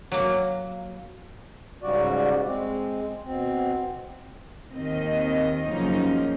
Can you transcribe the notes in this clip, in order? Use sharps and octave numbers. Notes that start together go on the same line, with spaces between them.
F#3 A#3
G#2 C#3 G3 F#4 D5
G#3 C4
B2 C4
D#2 D#3 C4 D#5
F#2 C#3 F3 A#3 C#4 D#4